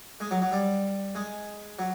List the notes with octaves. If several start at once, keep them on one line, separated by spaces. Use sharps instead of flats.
G#3
F#3
F#3
G3
G#3
F#3